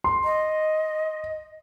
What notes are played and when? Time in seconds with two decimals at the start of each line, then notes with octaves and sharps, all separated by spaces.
0.04 C6
0.24 D#5